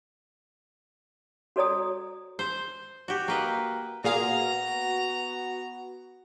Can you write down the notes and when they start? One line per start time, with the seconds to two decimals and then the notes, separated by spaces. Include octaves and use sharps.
1.56 F#4 A4 C#5 D5 A#5 D#6
2.39 C5
3.08 F#4 G4
3.28 A#3 B4 D#5
4.04 A#2 B3 F#4 G#4 F5 A#5